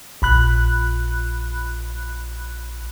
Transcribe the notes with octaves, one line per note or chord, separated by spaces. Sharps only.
A#1 B5 F#6